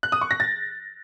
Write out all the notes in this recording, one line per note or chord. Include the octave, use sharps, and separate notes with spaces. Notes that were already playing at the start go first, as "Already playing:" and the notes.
F#6
D#6
C#6
A#6
A6